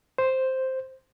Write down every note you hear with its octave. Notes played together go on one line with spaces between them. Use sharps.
C5